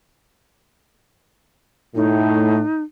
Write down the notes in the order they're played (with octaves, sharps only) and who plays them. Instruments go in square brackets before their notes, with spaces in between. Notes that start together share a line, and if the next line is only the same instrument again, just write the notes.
[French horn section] A2 [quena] D#4